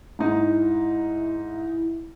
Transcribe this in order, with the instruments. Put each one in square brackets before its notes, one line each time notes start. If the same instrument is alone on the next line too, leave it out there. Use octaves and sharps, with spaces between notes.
[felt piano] G#2 D#4 [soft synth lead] E4